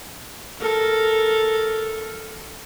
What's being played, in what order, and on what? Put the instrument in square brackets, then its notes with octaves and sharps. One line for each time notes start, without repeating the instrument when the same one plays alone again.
[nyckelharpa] A4 A#4